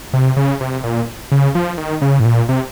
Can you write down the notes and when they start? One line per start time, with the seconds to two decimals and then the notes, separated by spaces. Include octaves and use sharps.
0.13 C3
0.37 C#3
0.61 C3
0.84 A#2
1.32 C#3
1.55 F3
1.78 D#3
2.02 C#3
2.20 A2
2.25 A#2
2.49 C3